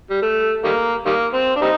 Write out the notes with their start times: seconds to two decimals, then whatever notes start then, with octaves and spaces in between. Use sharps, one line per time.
0.10 G3
0.22 A3
0.64 D#3 G3 A#3
1.06 D#3 G3 A#3
1.34 C4
1.56 D4
1.62 G3 C4 D#4